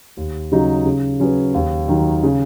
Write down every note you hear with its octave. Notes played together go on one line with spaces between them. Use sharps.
D#2
C#3 F#3 D#4
C#3
F#3 C#4 G#4 B4
D#2
D#3 F#3 D#4
C#3